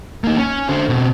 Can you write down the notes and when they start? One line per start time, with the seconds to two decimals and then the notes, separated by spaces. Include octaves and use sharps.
0.24 A#3 D#4
0.38 C#4
0.68 D3 C5
0.89 B2 C4